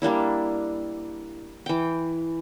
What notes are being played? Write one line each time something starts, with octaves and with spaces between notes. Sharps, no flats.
G3 A#3 D4 E4
E3 G5